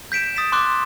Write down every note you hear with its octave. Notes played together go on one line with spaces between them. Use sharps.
G6 B6 D7 E7
D#6 A6 B6 E7
C6 D6 F#6